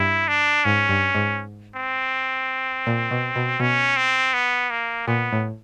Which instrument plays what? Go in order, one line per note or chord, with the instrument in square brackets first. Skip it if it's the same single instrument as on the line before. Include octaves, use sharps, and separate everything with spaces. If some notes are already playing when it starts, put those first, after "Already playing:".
Already playing: [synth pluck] G2 [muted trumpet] E4
[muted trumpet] D4
[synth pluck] G#2 [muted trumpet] C#4
[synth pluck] G2
G#2
[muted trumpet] C4
[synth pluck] A#2
B2
B2
[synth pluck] B2 [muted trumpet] C#4
[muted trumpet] C4
B3
A#3
[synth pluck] A#2 [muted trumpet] B3
[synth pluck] A2